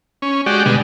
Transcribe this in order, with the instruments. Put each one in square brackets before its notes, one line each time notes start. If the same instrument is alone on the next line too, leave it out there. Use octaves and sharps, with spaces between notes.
[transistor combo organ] C#4
G#3 F#4 G4 D5
B2 D3 G3 G#3